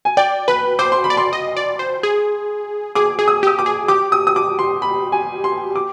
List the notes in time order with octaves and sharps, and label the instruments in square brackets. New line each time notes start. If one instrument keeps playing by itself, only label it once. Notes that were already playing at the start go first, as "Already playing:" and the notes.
[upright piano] G#5
[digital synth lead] D5 [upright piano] G5
[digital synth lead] B4 [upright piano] B5
[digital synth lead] C5 [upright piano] D6
[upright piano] C6
B5
[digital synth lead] D5
[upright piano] C6
[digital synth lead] D#5
D5
C5
G#4
[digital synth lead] G#4 [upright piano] D6
[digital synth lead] G#4
[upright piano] D#6
[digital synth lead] G4 [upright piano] D#6
[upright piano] D6
[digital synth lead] G#4
[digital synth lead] G4 [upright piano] D6
[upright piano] D#6
D#6
D6
C6
B5
G#5
C6
D6